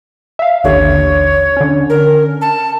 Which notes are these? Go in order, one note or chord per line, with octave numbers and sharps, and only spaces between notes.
E5 F5
A1 D#2 D3 C#5
D3 C#4
A#4
A5